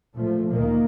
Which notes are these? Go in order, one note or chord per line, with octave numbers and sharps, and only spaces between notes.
A#2 F3 A3
D2 A#2 D#3 A#3